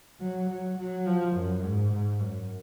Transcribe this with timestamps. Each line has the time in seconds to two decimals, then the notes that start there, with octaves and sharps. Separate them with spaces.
0.20 F#3
0.50 F#3
0.78 F#3
1.07 F3
1.36 F#2
1.64 G#2
1.93 G#2
2.21 F#2